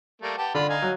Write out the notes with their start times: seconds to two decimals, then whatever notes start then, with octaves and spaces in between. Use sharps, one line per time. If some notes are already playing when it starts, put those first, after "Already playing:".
0.22 G3 A3 A#3
0.38 B3 G4 A5
0.55 D3 F4 B5
0.69 D#4 F5 G#5
0.82 F#3